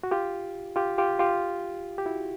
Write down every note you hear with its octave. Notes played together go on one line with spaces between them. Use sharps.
F#4
F4 G4
F4 G4
F4 G4
F4 G4
G4
E4 F#4